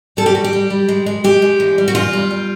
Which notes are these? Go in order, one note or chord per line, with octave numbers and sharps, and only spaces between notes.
G3 A4
G4
G3 F#4
G4
G3
G3
G#3
G#3
G#3 G4
G#3
E2
G3
F#4
E2 F4
G3
G3